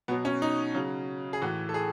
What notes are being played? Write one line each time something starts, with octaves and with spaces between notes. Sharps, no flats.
B2 F#3 B3
C#4
D#4
C#3 F#3
G#4
A2 E3 F#4
A4
G#4